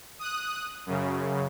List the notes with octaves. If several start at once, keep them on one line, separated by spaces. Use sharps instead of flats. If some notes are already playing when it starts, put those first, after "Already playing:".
D#6 F#6
F#2 C#3